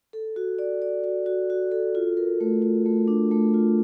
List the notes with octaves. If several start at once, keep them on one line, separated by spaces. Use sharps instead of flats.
A4
F#4
D5
D5
F#4
F#4
F#4
A4
F4
A#4
A3
F4
A3
D4
A3
F4